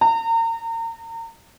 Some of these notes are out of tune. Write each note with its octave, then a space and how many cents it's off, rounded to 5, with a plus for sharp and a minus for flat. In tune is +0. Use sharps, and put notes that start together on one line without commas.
A#5 -35